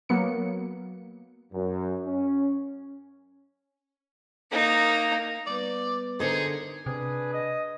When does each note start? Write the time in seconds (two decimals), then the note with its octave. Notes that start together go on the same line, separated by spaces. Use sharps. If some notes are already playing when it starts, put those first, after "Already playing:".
0.09 F#3 A#3 B3 C#7
1.53 F#2
2.06 C#4
4.52 A#3 D#4
5.47 G3 B3 B4 D5
6.20 D3 D#4 G#4 A#4 C5
6.86 C3 D4 G#4 B4
7.33 D#5